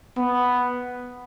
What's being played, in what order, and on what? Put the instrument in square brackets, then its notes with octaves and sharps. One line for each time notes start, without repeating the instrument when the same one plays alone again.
[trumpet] B3